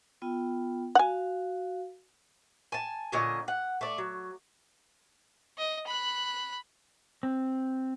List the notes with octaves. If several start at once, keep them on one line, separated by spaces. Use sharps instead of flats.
B3 F4 G5
F#4 F5 F#5 G#5
G#5 A5
A#2 D3 C#4 D#5
F#5
A3 D5
F#3
D#5
B5 F#6
C4